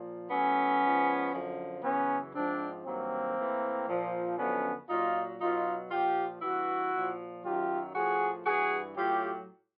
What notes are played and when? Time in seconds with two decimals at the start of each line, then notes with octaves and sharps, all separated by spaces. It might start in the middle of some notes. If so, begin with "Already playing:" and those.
Already playing: A#2 F3
0.30 A2 F#3 B3 C#4
0.83 G#2 F3
1.32 F#2 D3 F3
1.83 F#2 C#3 E3 B3 C#4
2.35 G#2 F3 C4 D4
2.85 G2 D#3 F#3 A#3 C4
3.36 A2 E3
3.88 A#2 F3
4.38 F#2 D3 F3 B3 C#4
4.89 A#2 F#3 D#4 F4
5.40 B2 F#3 D#4 F4
5.91 A#2 F3 F4 G4
6.42 G2 E3 E4 F#4
6.93 A#2
6.98 F3
7.44 F#2 D#3 F#3 F4 G4
7.94 A2 F3 F#4 G#4
8.45 G2 E3 F#4 G#4
8.96 A2 F#3 F4 G4